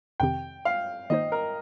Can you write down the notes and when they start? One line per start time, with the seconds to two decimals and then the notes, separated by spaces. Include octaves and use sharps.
0.20 F2 C3 D#3 C4 G4 G5
0.65 F5
1.10 D#3 A#3 D#4 C5 D#5
1.32 A#4